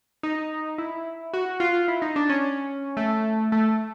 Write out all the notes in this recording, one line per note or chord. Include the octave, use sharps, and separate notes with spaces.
D#4
E4
F#4
F4
E4
D#4
D4
C#4
A3
A3